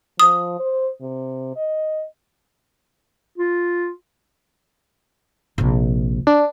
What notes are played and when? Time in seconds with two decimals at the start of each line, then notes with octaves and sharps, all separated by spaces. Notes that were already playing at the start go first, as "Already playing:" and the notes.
0.20 F3 D#6
0.59 C5
1.01 C3
1.56 D#5
3.38 F4
5.58 A#1 C3
6.27 D4